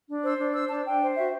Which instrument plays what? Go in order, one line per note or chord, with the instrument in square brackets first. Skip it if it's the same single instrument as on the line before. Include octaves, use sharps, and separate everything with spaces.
[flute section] D4
C5 E6
D4
C5 E6
D4 A5
D4 G5
C5
F#4 E5